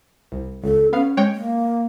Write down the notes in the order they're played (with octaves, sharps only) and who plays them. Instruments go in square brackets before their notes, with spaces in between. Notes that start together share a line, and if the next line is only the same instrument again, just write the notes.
[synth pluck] C2
[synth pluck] C#2 [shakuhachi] A4
[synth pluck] B3 F5 [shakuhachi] C#4
[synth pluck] G#3 C#5 G5
[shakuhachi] A#3